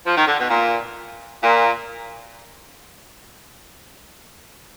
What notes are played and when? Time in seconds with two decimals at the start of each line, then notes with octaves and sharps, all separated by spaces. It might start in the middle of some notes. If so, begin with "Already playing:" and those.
0.06 F3
0.17 D#3
0.28 D3
0.39 B2
0.50 A#2
1.43 A#2